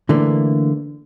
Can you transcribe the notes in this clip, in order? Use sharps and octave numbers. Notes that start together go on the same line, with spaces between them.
D3 E3 A3 A#3